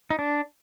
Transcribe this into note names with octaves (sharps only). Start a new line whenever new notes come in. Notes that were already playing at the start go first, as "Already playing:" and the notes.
D#4
D4